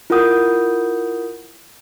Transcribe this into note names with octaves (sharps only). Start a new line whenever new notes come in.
E4 F4 A#4 F#5 D#6 G6